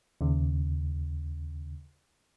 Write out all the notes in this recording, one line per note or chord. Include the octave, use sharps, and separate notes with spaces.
D#2 C#3